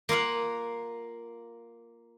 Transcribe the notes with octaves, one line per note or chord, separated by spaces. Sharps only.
A#3 F4 F5 F#5